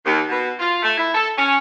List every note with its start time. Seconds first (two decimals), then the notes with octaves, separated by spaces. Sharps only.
0.05 D#2
0.29 B2
0.60 F4
0.82 A3
0.97 E4
1.14 A4
1.37 C#4